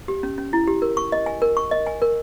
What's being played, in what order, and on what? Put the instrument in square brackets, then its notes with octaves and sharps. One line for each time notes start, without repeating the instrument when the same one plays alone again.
[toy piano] G4
C#4
C#4
E4
G4
A#4
C#6
D#5
G#5
A#4
C#6
D#5
G#5
A#4